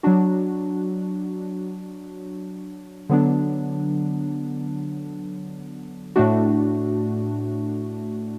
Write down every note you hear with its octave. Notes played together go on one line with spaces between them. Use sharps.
F#3 D4 F#4
D3 F#3 B3 D4
A2 A3 D4 F#4